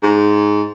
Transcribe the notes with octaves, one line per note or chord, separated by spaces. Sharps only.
G#2